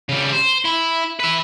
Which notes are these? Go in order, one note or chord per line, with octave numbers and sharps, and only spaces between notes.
C#3 G3
C5
E4
B4 E5